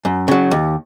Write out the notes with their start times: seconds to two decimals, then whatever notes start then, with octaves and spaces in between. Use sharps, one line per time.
0.05 F#2
0.28 C#3 F#3
0.51 D#2